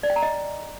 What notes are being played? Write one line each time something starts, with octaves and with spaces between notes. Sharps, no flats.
D5
G5
A#5
D#5